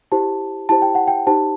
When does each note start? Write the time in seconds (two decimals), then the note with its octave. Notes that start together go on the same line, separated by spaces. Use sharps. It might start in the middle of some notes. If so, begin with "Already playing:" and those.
0.12 E4 G4 C5 A5
0.69 E4 G4 C5 A5
0.82 G5
0.95 F#5
1.08 G5
1.27 D#4 G4 C5 A5